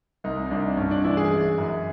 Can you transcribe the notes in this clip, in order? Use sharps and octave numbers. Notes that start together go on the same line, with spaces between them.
C2 D#4
D#4
C2 D4
G2 C#4
D4
E3 E4
G#4
G#3
F#2